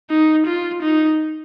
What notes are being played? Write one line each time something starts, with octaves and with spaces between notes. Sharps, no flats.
D#4
F4
D#4